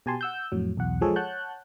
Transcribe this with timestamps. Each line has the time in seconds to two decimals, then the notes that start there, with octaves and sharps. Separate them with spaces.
0.06 B2 G4 G#5 A5 C6
0.21 F#5 E6 G6
0.52 F2 A2 F#3
0.77 B1 E2 F#5
1.01 F3 G#3 F4 G#4 A4 C#5
1.16 C#5 F#5 A5 F#6 G6